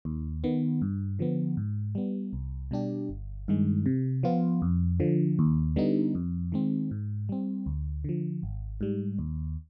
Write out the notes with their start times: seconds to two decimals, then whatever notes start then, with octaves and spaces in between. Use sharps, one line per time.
0.05 D#2
0.44 D#3 B3
0.82 G2
1.19 D3 F3 B3
1.57 G#2
1.95 G3 B3
2.33 C2
2.71 B2 G3 D4 G4
3.09 G1
3.48 G2 D#3 G#3
3.86 C3
4.23 F3 B3 F4
4.62 F2
5.00 D3 F3
5.39 D#2
5.76 D3 G3 B3 D#4
6.15 F2
6.52 D#3 G#3 C4
6.91 G#2
7.29 G3 C4
7.66 D2
8.04 D3 F3
8.43 G#1
8.81 G#2 G3
9.19 D#2